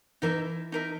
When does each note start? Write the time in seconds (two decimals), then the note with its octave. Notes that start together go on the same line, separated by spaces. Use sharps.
0.22 E3 D#4 A#4 E5
0.72 D#4 A#4 E5